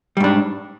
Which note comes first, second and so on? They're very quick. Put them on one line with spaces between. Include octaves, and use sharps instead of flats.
G3 G#2 D4